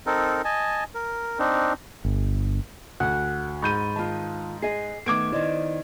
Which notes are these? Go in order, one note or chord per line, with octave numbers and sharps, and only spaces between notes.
C4 D#4 A4 A#4
D#5 G#5 A5
A#4
C4 D4 D#4
G1
D2 F#5 F#6
G#2 B5 C#6 G6 A6 D#7
D#3 F4 A5
G#4 D#5 C7
D#3 A3 B3 D6 G#6 D7
D#3 E4 C5 D5 D#5